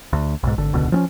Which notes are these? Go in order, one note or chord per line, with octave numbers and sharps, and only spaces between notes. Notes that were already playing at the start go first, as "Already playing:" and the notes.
D2
B1 G#2
G#1 D3
E1 C#2 B2 D3
F3 C4 C#4